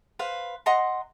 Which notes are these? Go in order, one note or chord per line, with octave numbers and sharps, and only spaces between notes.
B4 C5 F5
D#5 F#5 A#5 C6